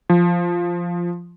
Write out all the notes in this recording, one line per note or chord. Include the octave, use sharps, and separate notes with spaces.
F3